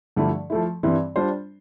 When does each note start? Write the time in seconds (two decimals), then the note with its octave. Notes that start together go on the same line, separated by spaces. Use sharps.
0.16 G2 D3 F3 A3 E4
0.50 F3 A3 E4
0.83 G2 E3 G3 C4 E4
1.16 G3 D4 F4 C5